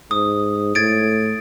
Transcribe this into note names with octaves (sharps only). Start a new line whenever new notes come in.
G#2 D#6
A2 G#6 A6 D7